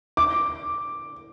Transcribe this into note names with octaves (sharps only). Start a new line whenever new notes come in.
D6